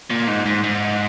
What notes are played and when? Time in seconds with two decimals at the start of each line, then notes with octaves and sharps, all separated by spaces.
0.10 A#2
0.28 G#2
0.46 G#2
0.64 G#2